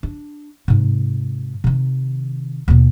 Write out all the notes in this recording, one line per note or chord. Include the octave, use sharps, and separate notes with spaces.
D4
G#2 C3
C3 D#3
D#2 B2